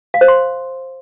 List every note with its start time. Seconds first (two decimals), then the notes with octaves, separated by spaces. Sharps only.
0.14 F5
0.21 C5
0.28 C6